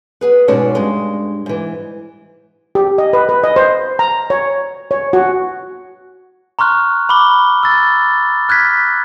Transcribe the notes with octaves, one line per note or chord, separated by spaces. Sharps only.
B3 G#4 B4
G#2 B2 G#3 C#4 D5 A5
G2 G#3
G#2 E3
G4
D#5
B4
B4
D#5
C5
A#5
C#5
C#5
F#4
A#5 C6 C#6 F6 F#6
B5 D6 G7
E6 A6
F6 F#6 G#6 B6